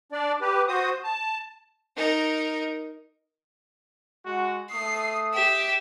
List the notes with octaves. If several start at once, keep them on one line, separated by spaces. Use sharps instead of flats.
D4 D5
G4 B4
F#4 C5 D#6
A5
D#4 A#4
G#3 F#4
A3 D#6 C7
G4 E5